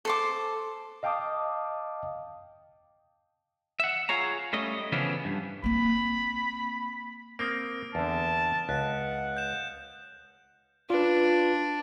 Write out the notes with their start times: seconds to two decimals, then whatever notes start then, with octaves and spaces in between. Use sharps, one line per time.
0.05 A4 C5 D6
1.03 D#5 F5 G5 A5 D6 D#6
3.80 E5 F#5
4.09 F4 G#4 C#5 A#5
4.53 G3 A3 C#4 D#5
4.92 C#3 E3 F3 B3 C#4 D4
5.25 G2
5.64 A#3 C4 B5
7.39 A#3 C4 D#6 F6 D7
7.95 E2 D3 A5
8.69 C#2 F#5 F#6
9.37 G6 E7
10.90 D4 F4 B4